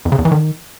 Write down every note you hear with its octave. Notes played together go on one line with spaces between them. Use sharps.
F2
C#3
E2
E3
D#3